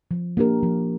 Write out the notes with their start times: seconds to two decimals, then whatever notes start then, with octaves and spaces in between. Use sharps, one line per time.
0.11 F3
0.37 A#3 D4 G4 A#4
0.63 F3